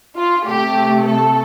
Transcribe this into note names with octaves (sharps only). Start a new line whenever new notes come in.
F4
C3 A3 G4
A4